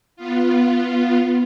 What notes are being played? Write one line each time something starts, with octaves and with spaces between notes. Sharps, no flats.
B3 F4